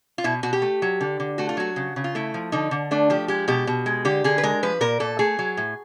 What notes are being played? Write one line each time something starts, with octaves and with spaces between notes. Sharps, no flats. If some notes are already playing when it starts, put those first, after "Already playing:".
F4
B2 E4
B2 F#4
G4
A3
F#3
D3
D3
A3 F#4
F4
F#3 F#4
C#3
C#3
F4
A3 E4
F3
D3 D#4
D3
A3 D4
F3 G4
G#3 G4
B2 G4
B2
G#3
D3 G4
D3 G#4
B4
G#3 A#4
F3 B4
A#2 A#4
A#2 A4
A3 G#4
F#3
A2